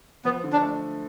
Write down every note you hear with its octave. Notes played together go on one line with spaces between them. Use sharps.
F3 B3
D3
D4
A3